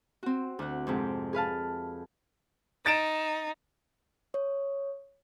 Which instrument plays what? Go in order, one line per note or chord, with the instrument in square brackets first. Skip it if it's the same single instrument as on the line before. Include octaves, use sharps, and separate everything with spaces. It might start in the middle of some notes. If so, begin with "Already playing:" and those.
[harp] C4 F#4
D2 F#5
F2 G#2 C3
G#4 B4 F5 A5
[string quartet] D#4 [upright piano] A6 D7 E7
[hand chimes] C#5 D#6